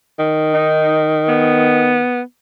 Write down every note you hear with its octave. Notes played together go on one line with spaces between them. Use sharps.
D#3
D#4
B3